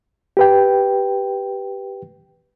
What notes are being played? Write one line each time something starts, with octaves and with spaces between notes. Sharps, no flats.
G4 B4 G5